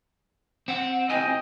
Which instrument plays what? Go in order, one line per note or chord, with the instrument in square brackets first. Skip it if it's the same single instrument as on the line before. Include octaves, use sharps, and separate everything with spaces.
[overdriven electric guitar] C4 [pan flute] F#5
[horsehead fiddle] D#5 G5 [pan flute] G#5